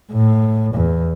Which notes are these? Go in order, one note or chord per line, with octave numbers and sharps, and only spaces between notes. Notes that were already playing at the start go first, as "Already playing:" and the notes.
A2
E2